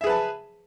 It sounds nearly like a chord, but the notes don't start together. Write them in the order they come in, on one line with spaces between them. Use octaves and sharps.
E5 G#4 B4 A5